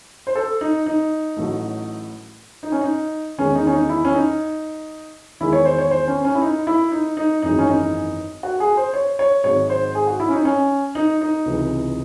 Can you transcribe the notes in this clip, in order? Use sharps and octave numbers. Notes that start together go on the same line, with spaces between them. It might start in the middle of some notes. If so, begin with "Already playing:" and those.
C5
A4
D#4
D#4
A1 A2 F#3 A3
D#4
C#4
D#4
E2 D#3 G#3 C#4
D#4
C#4
D#4
E4
C#4
D#4
E2 D#3 G#3 E4
C#5
C5
C#5
C5
C#4
C#4
E4
D#4
E4
D#4
D#4
G#1 F#2 E3 G#3 D#4
C#4
D#4
F#4
G#4
C5
C#5
C#5
G#1 G#2 F#3 C#5
C5
G#4
F#4
E4
C#4
D#4
C#4
D#4
D#4
C#2 C3 E3